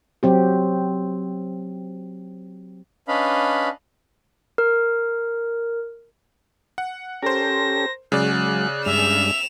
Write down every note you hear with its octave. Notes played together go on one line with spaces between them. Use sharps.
F#3 C4 G4
C#4 D4 B4 D#5 F5 B5
A#4
F#5
C#4 G4 A4 A#4 C5 A#6
C#3 F#3 G#3 D5 F#6
G2 G#3 D4 E5 E7 F7